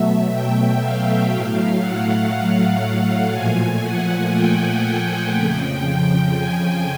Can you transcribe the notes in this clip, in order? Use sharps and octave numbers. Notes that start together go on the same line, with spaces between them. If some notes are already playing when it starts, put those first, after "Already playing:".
Already playing: B2 F#3 A3 E5
G5
F5
A2 F#3 A3
F#5
A#2 F3 A3 G#5
F#5
G5
G5
F2 C#3 F3
G#5